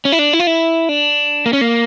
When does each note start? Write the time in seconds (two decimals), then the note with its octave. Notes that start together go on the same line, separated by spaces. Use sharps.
0.05 C#4
0.12 E4
0.19 D4
0.33 E4
0.40 F4
0.47 E4
0.89 D4
1.46 A#3
1.53 C#4
1.61 A#3